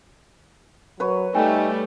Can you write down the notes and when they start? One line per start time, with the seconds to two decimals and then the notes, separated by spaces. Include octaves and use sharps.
1.00 F#3 B4 C#5
1.35 G3 A3 D#4 G5 G#5